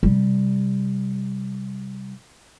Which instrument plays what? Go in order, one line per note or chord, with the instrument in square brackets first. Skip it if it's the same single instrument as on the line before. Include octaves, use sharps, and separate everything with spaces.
[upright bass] C3 G3